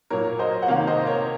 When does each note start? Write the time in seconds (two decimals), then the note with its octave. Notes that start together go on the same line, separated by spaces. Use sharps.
0.10 A#2 F#3 A#3 A#4 C#5
0.39 C5 D#5
0.62 F#5
0.68 C3 D#3 A#3 C#5 F5
0.87 C5 D#5
1.06 A#4 C#5